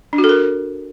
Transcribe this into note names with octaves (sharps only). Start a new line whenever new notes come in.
D4
F#4
A4
A#4